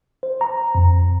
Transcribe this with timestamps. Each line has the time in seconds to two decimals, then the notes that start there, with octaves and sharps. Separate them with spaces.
0.23 C5
0.41 A#5
0.75 F2